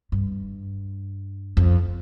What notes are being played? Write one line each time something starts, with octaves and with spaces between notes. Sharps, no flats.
G2
F2